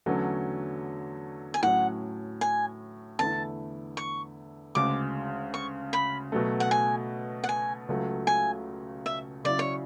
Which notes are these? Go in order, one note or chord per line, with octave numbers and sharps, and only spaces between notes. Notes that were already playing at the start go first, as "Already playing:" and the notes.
E2 D3 F#3 A3 C#4
G#5
A2 F#3 C#4 F#5
G#5
E2 D3 A3 E4 A5
C#6
D2 C#3 G#3 D6
C#6
B5
B2 F#3 A3
F#5
G#5
F#5
G#5
C#2 C#3 F#3 A3
G#5
E5
C#3 F#3 C#4 E4 D5
C#5